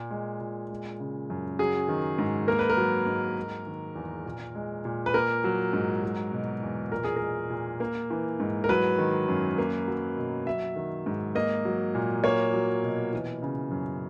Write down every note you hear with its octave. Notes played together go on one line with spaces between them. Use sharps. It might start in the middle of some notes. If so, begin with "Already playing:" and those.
Already playing: A#2
G#3
A#2
G#3
C#3
F#2
F#3 G#4
D#3
G#2
A#3 A#4
B4
A#4
F#3
G#2
G#3
D#3
E2
A#2
G#3
A#2
B4
A#3 A#4
F#3
G#2
F#3
B2
E2
A#2 A#4
G#4
G#3 A#4
A#2
A#3
E3
G#2
A#4
F#3 B4
D#3
F#2
A#3
F#3
B2
F#3 E5
D#3
G#2
A#3 D#5
F#3
A#2
A#3 C#5
F#3
B2
E3
C#3
F#2